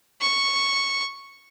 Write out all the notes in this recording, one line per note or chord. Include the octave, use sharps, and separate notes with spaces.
C#6